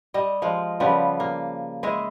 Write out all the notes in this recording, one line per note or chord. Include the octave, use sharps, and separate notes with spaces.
G3 D#5
F3 G#3
C#3 F3 G3 B3
A#3
G#3 E4 G#4 D#5